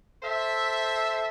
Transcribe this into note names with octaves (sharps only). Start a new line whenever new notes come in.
A4 C5 E5